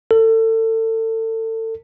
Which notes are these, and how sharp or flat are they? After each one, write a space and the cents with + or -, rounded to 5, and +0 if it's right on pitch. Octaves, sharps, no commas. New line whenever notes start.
A4 +30